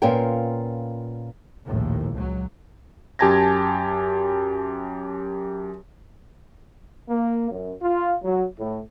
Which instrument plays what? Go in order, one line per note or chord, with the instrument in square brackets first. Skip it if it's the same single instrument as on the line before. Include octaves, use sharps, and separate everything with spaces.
[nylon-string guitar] A#2 B3 C#4 F4 A#4 G5
[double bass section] A#1 D#2 A2
C#2 F#3
[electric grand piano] F#2 G4 G#5 A5 G#6 A#6
[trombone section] A#3
F#2
F4
F#3
A2